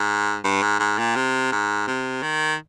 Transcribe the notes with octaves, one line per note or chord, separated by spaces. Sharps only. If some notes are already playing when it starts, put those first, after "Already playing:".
Already playing: G#2
G2
G#2
G#2
A#2
C3
G#2
C3
D#3